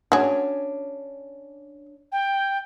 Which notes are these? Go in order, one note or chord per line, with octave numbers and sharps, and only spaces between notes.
C#4 D4 F#4 G#4
G5